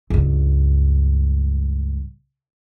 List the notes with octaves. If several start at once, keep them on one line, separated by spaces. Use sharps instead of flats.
C#2 G2